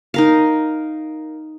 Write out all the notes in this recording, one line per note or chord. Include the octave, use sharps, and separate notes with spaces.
D#4 A#4 F5